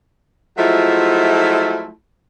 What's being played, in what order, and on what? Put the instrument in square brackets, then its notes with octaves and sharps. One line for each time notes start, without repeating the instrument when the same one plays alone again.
[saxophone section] F3 F#3 G#3 A3 E4 F4